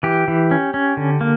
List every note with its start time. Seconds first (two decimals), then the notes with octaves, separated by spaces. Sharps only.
0.03 E3 G4
0.28 E3
0.51 C#4
0.74 C#4
0.97 D3
1.21 A#3